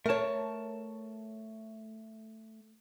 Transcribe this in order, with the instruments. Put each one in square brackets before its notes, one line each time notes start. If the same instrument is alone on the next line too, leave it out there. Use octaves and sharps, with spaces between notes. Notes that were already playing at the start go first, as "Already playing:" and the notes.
[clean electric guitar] A3 A5 [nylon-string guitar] A#4 C#5